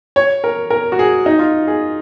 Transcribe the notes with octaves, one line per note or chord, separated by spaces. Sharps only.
C#5
A#4
A#4
F#4
G#4
D#4
F4
G#4